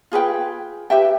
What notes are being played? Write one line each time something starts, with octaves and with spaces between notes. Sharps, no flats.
F4 G#4 B4 G5
G4 B4 E5 G5